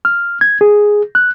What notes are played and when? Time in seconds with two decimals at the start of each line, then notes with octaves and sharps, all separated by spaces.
0.05 F6
0.41 G#6
0.61 G#4
1.15 F#6